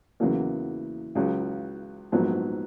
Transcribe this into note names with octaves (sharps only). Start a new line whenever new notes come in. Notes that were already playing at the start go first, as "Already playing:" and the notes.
E2 C#3 F#3 A#3
C#2 C#3 F#3
A#1 G#2 F#3 B3